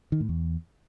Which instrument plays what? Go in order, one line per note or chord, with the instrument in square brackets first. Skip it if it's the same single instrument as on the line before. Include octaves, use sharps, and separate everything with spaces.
[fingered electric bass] D#3
A2
E2